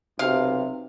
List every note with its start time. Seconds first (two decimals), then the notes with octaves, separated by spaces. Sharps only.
0.19 B1 C3 F5